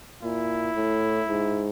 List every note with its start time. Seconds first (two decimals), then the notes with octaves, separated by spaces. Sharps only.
0.23 A#2 E4
0.76 A2
1.28 G#2